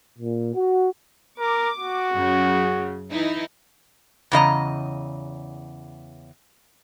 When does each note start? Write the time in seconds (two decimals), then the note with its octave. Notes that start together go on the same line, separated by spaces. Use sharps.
0.19 A#2
0.55 F#4
1.39 A#4 D6
1.78 F#4
2.14 F#2 C#3
3.11 E3 D#4 E4
4.32 E2 C#3 D#5 A#5